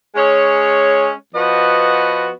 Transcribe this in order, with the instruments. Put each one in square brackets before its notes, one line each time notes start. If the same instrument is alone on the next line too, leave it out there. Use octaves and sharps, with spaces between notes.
[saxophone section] G#3 C#4 G#4 C#5
F3 B3 F#4 B4 D#5